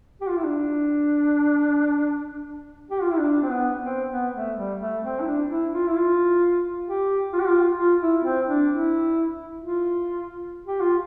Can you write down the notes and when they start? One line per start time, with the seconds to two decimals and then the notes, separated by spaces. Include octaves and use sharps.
0.21 G4
0.29 F4
0.37 E4
0.44 D4
2.91 G4
3.02 F4
3.11 E4
3.19 D4
3.42 C4
3.50 B3
3.81 C4
4.11 B3
4.35 A3
4.57 G3
4.80 A3
5.03 C4
5.20 E4
5.26 D4
5.49 E4
5.72 F4
5.88 E4
5.96 F4
6.87 G4
7.33 F4
7.40 G4
7.48 F4
7.78 F4
8.01 E4
8.24 C4
8.48 D4
8.70 E4
9.62 F4
10.67 G4
10.81 F4